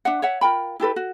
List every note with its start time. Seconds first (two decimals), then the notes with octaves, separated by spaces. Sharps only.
0.05 D4 E5 F#5
0.22 C#5 E5 F#5
0.41 F4 A#4 G5 B5
0.80 E4 G4 A4 B4
0.96 F#4